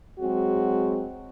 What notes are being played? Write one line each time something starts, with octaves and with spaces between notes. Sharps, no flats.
F#3 G#3 C4 F#4 G#4